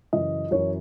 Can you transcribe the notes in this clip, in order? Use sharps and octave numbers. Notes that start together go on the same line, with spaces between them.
F#2 C#3 E3 D#5
F#2 E3 C#5